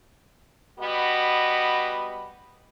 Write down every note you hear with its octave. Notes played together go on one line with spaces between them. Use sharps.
G3 B3 F#4 D#5